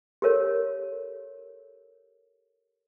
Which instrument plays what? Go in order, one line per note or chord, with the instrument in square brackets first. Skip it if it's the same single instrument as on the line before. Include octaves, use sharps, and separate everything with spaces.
[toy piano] G4 A4 A#4 C#5